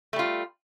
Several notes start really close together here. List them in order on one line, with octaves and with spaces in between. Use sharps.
A3 G3 F4